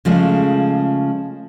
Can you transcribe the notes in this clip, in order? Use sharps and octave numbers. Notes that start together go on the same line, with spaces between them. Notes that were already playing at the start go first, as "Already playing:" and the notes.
C#3 F3 G#3 A3